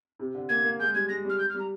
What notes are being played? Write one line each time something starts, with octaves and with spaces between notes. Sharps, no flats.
C3
D3
A#3 G#6
A#3
G#3 G6
G3 G#6
G#3 A#6
G3 F6
G6
F6
G3 A#5